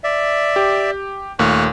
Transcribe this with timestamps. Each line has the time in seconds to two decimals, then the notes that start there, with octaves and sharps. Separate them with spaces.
0.04 D5 E5
0.56 G4
1.39 D#2 A#2 A3 C#6 F6 F#6